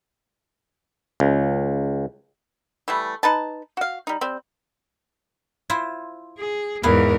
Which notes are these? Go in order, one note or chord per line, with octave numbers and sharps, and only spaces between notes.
C#2
E3 G3 A3
D#4 B4 A5
F#4 F5
G3 D#4
G3 C4
E4 F4 C5
G#4
E2 G#2 B3 E4 A#4 F5